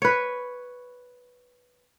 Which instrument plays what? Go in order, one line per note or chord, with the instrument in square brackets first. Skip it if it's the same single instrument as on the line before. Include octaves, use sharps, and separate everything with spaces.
[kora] B4 C#5